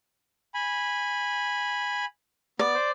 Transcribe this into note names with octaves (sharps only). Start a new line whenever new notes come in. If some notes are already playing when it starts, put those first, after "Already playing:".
G#5 B5
B3 D5
C5